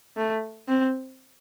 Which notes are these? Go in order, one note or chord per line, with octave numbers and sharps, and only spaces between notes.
A3
C4